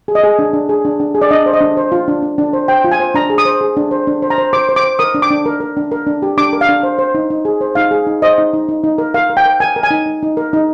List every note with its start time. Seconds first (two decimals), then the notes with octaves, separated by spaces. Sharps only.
0.08 G#4
0.15 D#5
0.23 G#4
0.39 D4
0.53 D4
0.69 G#4
0.85 D4
1.00 D4
1.15 G#4
1.21 D5
1.31 D4 D#5
1.46 C5
1.53 D#5
1.61 D4
1.77 C5
1.92 F4
2.08 D4
2.23 D4
2.38 D4
2.53 C5
2.68 C5 G5
2.85 F4
2.91 G#5
3.00 C5
3.15 D4 A#5
3.30 G#4
3.38 D#6
3.45 C5
3.61 G#4
3.77 D4
3.91 C5
4.07 D4
4.22 C5
4.30 A#5
4.38 C5
4.53 C5 D6
4.69 C5
4.76 D6
4.84 C5
4.99 A#4 D#6
5.15 D4
5.22 D6
5.30 D4
5.46 A#4
5.60 A#4
5.77 D4
5.91 A#4
6.07 D4
6.22 G4
6.38 D4 D6
6.53 A#4
6.61 F5
6.69 D4
6.83 C5
6.99 C5
7.15 D#4
7.30 D#4
7.45 G#4
7.61 C5
7.75 D#4 F5
7.91 G#4
8.07 D#4
8.22 C5 D#5
8.38 D#4
8.53 D#4
8.68 D#4
8.84 D#4
8.98 A#4
9.14 A#4 F5
9.30 A#4
9.37 G5
9.45 A#4
9.60 A#4 G#5
9.76 A#4
9.83 G#5
9.91 D#4
10.06 D#4
10.22 D#4
10.37 A#4
10.53 D#4